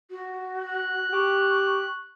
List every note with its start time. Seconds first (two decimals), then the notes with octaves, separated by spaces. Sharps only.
0.10 F#4
0.60 F#6
1.13 G4 C#6